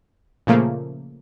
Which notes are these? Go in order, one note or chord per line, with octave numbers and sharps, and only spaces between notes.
A#2 C#3 F3 A3 A#3